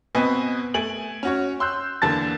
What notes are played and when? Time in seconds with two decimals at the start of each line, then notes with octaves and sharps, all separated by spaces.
0.15 B2 B3 C4 B4 D#5 G#5
0.74 A3 G#5 D7 F#7
1.23 C#4 F#4 C#5
1.60 C6 E6 F#6 G6
2.02 E2 D3 A#3 A5 A6